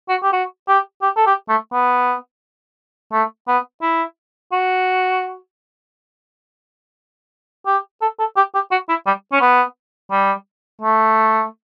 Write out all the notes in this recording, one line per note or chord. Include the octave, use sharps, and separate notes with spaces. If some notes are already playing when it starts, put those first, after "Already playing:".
F#4
G4
F#4
G4
G4
A4
G4
A3
B3
A3
B3
E4
F#4
G4
A4
A4
G4
G4
F#4
E4
G3
C#4
B3
G3
A3